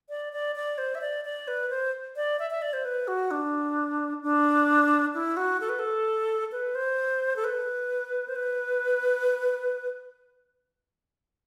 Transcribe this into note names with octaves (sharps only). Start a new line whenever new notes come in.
D5
D5
D5
C5
E5
D5
D5
B4
C5
D5
E5
E5
D5
C5
B4
F#4
D4
D4
E4
F#4
A4
B4
A4
B4
C5
A4
B4
C5
B4